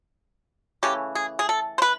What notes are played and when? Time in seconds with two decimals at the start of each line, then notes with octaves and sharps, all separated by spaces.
0.83 C#3 E3 A3 C#4 G4
1.15 G#4
1.39 G#4
1.49 A4
1.78 C5
1.82 B4